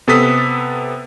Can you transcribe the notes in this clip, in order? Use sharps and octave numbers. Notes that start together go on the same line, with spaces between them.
C3 B3 A4 D#6 B6